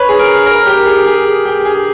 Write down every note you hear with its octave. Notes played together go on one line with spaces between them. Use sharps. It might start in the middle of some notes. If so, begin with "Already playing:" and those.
Already playing: B4 C#5
G#4
A#4
A#4
G4
G#4
G#4
G#4
G4
G#4